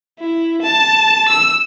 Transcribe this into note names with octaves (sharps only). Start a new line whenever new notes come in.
E4
A5
E6